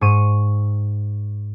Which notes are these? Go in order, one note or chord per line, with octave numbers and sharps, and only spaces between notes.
G#2 C#6 D#7